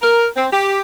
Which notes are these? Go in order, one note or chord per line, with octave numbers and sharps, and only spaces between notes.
A#4
C4
G4